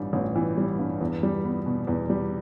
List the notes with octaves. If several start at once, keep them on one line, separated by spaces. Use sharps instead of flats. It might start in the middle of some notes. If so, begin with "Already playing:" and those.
Already playing: A1 G2 E3 G3
A1
E3
G3
G2
E2
G3
B3
B2
E2
G3